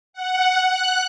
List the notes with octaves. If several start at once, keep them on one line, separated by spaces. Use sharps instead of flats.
F#5
F#6